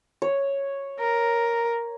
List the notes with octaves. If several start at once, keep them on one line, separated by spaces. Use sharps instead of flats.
C#5
A#4